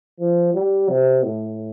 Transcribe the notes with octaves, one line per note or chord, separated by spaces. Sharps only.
F3
G3
C3
A2